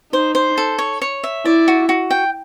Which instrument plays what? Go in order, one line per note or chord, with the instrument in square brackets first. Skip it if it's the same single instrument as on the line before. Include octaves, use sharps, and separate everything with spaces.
[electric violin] D#4 [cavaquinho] C5
[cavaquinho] C5
A4
C#5
C#5
E5
[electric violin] E4 [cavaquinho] D5
[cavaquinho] F#4
F#4
G5